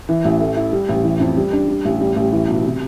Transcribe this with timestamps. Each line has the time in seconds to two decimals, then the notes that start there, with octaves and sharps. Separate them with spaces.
0.09 E3
0.25 A1
0.41 A3
0.57 E4
0.73 G3
0.89 A1
1.04 E3
1.20 F2
1.37 G3
1.53 D4
1.68 G3
1.85 A1
2.01 G3
2.16 A1
2.32 E3
2.48 B1
2.64 C3